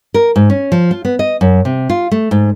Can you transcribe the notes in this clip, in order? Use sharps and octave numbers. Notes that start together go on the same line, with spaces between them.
A#4
G#2
C#4
F3
F4
B3
D#5
F#2
C3
F4
A3
G#2